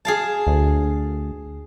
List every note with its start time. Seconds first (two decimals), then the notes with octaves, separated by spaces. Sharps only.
0.05 G#4 F5 A5
0.47 D2